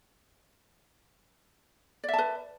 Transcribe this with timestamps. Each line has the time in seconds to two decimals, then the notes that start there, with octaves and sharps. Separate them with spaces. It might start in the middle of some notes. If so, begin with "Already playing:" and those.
2.04 D5
2.09 E5
2.13 A5
2.18 B4